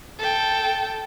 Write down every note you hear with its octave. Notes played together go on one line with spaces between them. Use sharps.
A4 G5